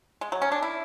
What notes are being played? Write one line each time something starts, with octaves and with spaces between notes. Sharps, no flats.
G#3
F#3
C#4
D4
E4